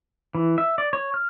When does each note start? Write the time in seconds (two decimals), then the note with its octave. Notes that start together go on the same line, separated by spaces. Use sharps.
0.35 E3
0.58 E5
0.78 D5
0.93 C#5
1.14 F6